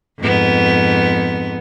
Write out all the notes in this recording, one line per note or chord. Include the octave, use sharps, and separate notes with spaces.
F2 G#2 B3